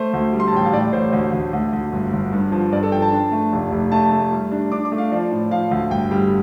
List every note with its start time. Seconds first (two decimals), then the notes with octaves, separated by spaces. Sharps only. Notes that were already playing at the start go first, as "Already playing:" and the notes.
Already playing: A3 C5
0.13 D2
0.33 G3
0.40 C6
0.48 A5
0.53 A1 G5
0.65 F5
0.73 A2 D5
0.93 A1 C5
1.13 D2
1.33 D2
1.53 D2
1.73 D2
1.93 G1
2.13 G1
2.33 G2
2.52 F3
2.72 G2 D5
2.83 A4
2.92 F3 G5
3.02 A5
3.12 D4
3.32 A3
3.52 F1
3.72 F1
3.92 A3 A5
4.12 A3
4.32 G3
4.52 D4
4.72 D4 D6
4.85 D6
4.92 A3
4.98 F5
5.12 F3 D5
5.32 A2
5.51 F3 F5
5.71 D2
5.91 G1 G5
6.11 G3